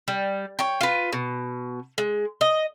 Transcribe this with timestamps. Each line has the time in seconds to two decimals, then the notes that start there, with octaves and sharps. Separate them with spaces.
0.08 G3
0.59 C#5 G5
0.81 F4 B4
1.13 B2
1.98 G#3
2.41 D#5